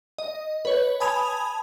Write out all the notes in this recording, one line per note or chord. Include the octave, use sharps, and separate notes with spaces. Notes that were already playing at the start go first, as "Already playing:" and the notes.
D#5
B4 C#5
G#5 A5 B5 D#6 G#6 F7